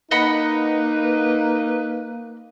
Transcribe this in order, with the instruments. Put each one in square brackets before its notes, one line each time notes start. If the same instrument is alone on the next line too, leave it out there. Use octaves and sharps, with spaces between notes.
[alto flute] A#3 [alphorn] D#4 [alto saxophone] B4 [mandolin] D#5 F#5 B5